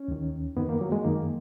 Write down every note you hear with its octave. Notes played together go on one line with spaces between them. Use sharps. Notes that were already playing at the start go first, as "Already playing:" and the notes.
Already playing: C#4
D#2 D#3
F#2 D#3 B3
A#3
F#3
G#3
F#2 D#3 A#3